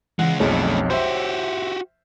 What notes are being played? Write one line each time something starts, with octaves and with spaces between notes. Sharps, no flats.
C#3 E3 G#3 F#5
B1 F2 F3 G#3 A3 D4 C#5
F#4 G4 C5 E5